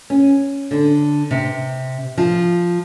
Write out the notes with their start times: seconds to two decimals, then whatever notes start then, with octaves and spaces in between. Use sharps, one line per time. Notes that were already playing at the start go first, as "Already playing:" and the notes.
0.10 C#4
0.71 D3
1.31 C3
2.18 F3